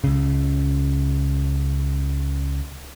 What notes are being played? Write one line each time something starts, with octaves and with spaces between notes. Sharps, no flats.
C#2 C#3